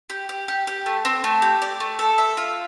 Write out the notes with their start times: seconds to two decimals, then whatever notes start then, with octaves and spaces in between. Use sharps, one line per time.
0.10 G4
0.29 G4
0.48 G4
0.67 G4
0.86 A3
1.05 C4
1.24 A3
1.42 G4
1.62 D5
1.80 A3
1.99 A4
2.18 E5
2.37 F4